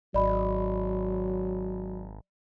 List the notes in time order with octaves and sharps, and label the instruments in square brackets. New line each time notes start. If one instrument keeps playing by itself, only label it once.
[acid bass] G#1 [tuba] F#3 [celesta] D5 D#5 B5